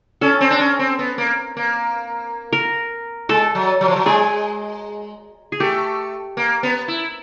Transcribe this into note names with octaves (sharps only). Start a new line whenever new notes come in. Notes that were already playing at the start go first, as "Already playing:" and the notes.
C#4 A4
C4
D4
C#4
C4
B3
A#3
A#3
A#4
G#3 A4
F#3
F#3
F3
F#3
G#3 G#4
G#4
A3 G4
A#3
B3
E4